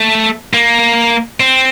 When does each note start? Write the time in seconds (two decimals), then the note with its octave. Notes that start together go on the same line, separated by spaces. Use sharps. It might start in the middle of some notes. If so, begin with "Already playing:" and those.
Already playing: A3
0.54 A#3
1.40 C4